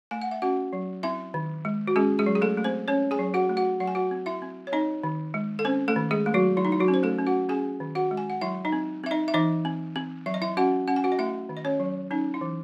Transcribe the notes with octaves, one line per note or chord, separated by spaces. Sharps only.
A3 G#5
F#5
E5
C#4 F#4 F#5
F#3
C4 E4 E5
D#3
G#3
F#4
G#3 C#4 G#4
G#3 G#4
F#3
G#4
A3 A4
A3
C4 C5
C#4 C#5
G#4 G#5
F#3
F#4 F#5
A3
F#4 F#5
F#3 F#5
G#5
F#4 F#5
C4
E4 E5
C4
C#5
C4 D#4 D#5
D#3
G#3
A4
C4 C#4 C5
A3 A4
D#3
G#3 G#4
A3
F#3 F#4
F#3 E4
D#4
E4
F#3 F#4
C#4
C5
A3 A4
C#4
F#4 F#5
C#4 G#4 G#5
D#3
F#4 F#5
G#3
G#5
F#5
F#3 E4 E5
D#4 D#5
C4
C4 E5
D#4 D#5
E5
E3 D#4 D#5
C4
C4
F#3 E5
D#5
E4 E5
C#4 F#4 F#5
C#4 F#5
G#5
F#4 F#5
D#5
A3 E4 E5
D#3
D#5
C#4 C#5
F#3
C#4 D#4
E4
E3